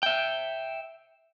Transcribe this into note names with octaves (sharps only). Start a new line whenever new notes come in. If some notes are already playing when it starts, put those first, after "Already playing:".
E5 G5